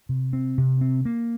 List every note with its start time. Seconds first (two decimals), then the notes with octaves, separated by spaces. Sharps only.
0.09 C3
0.33 C4
0.58 C3
0.81 C4
1.05 A#3